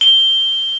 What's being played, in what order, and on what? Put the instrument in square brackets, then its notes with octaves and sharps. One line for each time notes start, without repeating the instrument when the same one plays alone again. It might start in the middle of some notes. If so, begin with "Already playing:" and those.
[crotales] G7